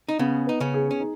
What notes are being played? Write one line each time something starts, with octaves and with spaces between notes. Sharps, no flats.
D#4
C#3 B3 C#4
D#4 B4
C#3 C#4
G#4
C#4
D#4